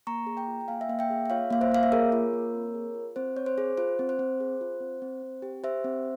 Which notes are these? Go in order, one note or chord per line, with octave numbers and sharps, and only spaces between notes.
A#3 A#5 C#6
G#4
G5 A#5
F4
G5
A#3 F5 G#5
E5
A#3 F5
E5 G5
G#4
E5
F4 C#5 F5
A#3 F5
C5 E5
A#3 F5
E5
G#4 A#4 C#5
F4
A#3
C4
G#4
F4
C4 C5
C4 C#5
C5
G#4
F4 C5
C4
C5
C4
G#4
F4
C4
C4
C4
G4
G4 C5 E5
C4